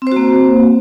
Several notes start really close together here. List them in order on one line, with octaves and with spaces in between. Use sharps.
C4 C5 F#4 A#3